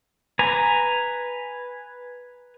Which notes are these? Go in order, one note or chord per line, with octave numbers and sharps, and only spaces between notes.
B4 G#5 A#5